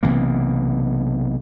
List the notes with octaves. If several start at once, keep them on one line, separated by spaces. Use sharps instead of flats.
B1 C3 E3 A#3